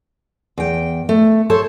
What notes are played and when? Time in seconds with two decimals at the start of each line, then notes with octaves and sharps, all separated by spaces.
0.58 E2 G5
1.09 A3
1.50 A4 C5 C#5